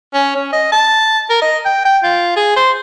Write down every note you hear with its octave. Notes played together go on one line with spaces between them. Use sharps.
C#4
C#4
D#5
A5
A#4
D#5
G5
G5
F4
G#4
C5